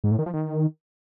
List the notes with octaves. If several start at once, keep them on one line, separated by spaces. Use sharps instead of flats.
G#2
A2
D#3
F3
D#3